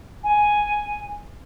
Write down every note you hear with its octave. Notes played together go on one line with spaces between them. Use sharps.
G#5